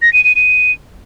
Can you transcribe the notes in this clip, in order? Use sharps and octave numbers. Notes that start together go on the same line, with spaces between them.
A#6
D#7
D#7
D#7